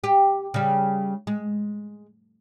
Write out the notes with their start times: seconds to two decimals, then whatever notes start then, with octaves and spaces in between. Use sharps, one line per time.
0.04 G4
0.54 C#3 G3
1.27 G#3